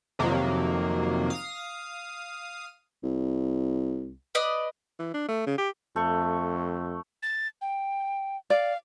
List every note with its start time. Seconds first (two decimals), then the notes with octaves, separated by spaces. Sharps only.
0.19 F2 C3 D#3 F#3 A#3
1.30 F5 D#6
3.04 C2
4.35 B4 D5 D#5
4.99 E3
5.14 D4
5.28 A3
5.46 C#3
5.58 G4
5.96 F2 A3 C#6
7.23 A6
7.61 G5
8.50 D5 F5